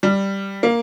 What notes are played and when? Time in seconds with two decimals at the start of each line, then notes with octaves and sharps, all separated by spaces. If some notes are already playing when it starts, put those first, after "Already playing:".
0.03 G3
0.63 A#3